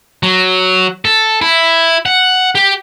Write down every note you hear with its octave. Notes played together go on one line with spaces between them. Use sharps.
F#3
A4
E4
F#5
G4